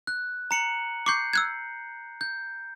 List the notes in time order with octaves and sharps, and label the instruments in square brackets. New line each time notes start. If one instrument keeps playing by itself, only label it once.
[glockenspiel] F#6
A#5 C#7 F#7
[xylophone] C#6 D6 [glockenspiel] G6 C7 C#7
[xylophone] E6 F#6 G#6
[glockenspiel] G6